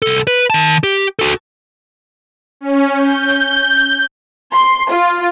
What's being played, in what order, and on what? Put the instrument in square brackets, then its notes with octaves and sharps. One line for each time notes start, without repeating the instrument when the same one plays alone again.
[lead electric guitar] C2 A4
B4
D#3 A5
G4
F#4 A4
[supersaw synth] C#4
G6
[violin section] C6
F4